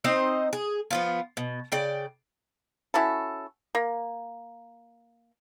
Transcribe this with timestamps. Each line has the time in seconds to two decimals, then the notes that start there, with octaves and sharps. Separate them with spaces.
0.04 C4 D#4 C5 D#5
0.53 G#4
0.91 F3 B3 F4
1.37 B2
1.72 C#3 D5 G5
2.94 C#4 E4 F#4 A4
3.75 A#3